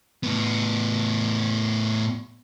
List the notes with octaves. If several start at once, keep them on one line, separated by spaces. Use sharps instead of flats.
A2 B3